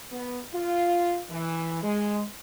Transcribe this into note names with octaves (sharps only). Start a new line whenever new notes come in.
B3
F4
E3
G#3